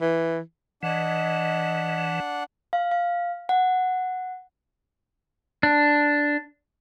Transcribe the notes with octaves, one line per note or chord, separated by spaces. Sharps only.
E3
E3 D4 D#5 F#5
F5
F5
F#5
D4